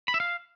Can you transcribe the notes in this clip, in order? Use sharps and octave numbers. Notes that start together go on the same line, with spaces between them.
B5
E5
F5